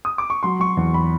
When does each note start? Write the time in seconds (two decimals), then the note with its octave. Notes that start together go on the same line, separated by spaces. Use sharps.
0.05 D#6
0.18 D6
0.30 C#6
0.43 F#3 C6
0.60 F#3 C#6
0.77 E2
0.94 B5